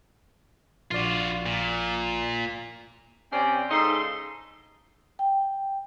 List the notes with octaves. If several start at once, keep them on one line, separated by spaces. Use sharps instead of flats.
A#1 F4 F#4 D5
A#2
C3 C#4 C5 D5 G5
G#2 C#3 D#4 A4 C6
G5